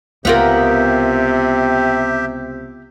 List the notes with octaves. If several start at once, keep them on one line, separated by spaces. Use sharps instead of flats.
C#2 C3 B3 F4 G4 A#4 E5